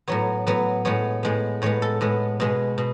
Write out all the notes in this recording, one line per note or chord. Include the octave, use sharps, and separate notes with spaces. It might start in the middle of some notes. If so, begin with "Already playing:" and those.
A2 F#3 B3 C#5
A2 F#3 B3
A2 G#3 B3 C#5
A2 G#3 B3
A2 G#3 B3 C#5
A4
A2 G#3 B3
B2 G#3 B3
B2